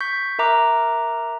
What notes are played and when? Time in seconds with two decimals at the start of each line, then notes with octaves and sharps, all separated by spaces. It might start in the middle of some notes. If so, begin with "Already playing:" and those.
0.01 C#6 G6 B6
0.39 A#4 E5 A#5 D6 F#6